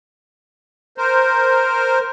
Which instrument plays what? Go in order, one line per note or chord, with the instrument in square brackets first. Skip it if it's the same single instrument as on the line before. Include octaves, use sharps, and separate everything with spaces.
[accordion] A#4 C5